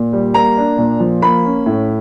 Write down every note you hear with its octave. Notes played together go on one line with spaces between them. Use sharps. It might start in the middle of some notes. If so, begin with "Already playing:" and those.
Already playing: A#2
G3
A#3 A#5
D4
A#2
F3
A#3 B5
C#4
A2